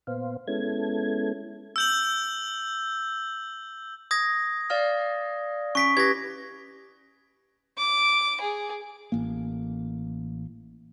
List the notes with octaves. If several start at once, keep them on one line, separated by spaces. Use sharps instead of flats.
A#2 B3 C5 F5
G#3 B3 C#4 E4 A4 G#6
E6 G6 F#7
D#6 G#6 A#6
D5 F5 F6
C#4 C#6 B6 D7
E4 G4 B4 G#6 A#6
D6
G#4
A1 A#3